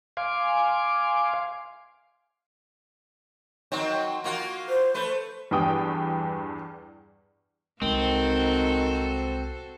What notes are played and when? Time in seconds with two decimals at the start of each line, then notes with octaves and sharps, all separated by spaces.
0.17 F5 G#5 C6 D6
3.72 D#3 F#3 C4
4.24 A#3 F4 F#4
4.69 C5
4.94 A3 B4
5.51 E2 G2 E3 D4 G5 D#6
7.82 C2 D#3 G#3 C4 F#4 A4 C5